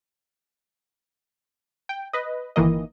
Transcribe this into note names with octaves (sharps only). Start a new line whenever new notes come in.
G5
B4 D#5
G1 D#3 E3 A#3 D#5